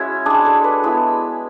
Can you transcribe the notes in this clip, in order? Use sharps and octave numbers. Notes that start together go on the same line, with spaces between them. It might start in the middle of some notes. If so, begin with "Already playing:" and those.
Already playing: G#3 C#4 E4 F#4
G#3 D4 G#4
A4
B4
G#3 B3 E4